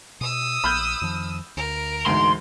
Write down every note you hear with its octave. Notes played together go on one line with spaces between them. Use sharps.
B2 D#6 E6
A#1 B5 F6 G6
F2 D#3 F3
D2 A#4
D2 G#2 E3 G#3 C6